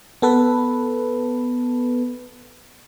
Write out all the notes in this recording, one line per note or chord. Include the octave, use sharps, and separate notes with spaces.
B3 A4 B4